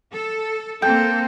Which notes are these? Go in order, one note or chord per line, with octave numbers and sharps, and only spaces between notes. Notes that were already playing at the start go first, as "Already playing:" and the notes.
A4
A#3 C4 A4 G5